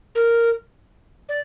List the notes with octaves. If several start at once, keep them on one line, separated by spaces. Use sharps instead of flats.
A#4
D5